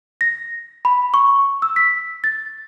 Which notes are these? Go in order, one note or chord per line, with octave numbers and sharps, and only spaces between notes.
A#6
B5
C#6
E6
B6
A6